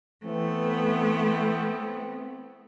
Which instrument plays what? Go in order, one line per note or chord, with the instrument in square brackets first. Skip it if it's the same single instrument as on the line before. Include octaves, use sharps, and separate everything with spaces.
[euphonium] E3 [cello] A3 B3 [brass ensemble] C4